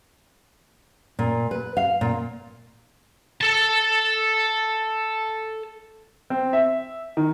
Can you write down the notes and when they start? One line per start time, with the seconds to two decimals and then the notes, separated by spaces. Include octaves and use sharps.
1.19 A#2
1.51 B4
1.77 F5
2.01 A#2
3.41 A4 A5
6.30 C4
6.53 E5
7.17 D#3